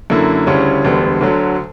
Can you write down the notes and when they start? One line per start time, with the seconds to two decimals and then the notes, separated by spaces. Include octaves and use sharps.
0.10 F#2 D3 A#3 E4
0.47 D2 C#3 G3 C#4 E4
0.84 E1 D2 D3 G3 B3
1.21 D2 D3 F#3